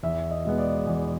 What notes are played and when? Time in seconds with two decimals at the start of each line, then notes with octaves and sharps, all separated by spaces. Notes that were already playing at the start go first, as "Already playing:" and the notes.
0.03 E2 E5
0.31 D#5
0.45 B2 G#3 B3
0.58 D5
0.87 E2